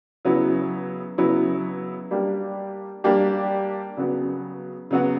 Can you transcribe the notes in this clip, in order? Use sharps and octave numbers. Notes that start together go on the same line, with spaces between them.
C#3 F#3 B3 E4
C#3 F#3 B3 E4
G3 A#3 D4 G4
G3 A#3 D4 G4
C#3 F#3 B3 F#4
C#3 F#3 B3 F#4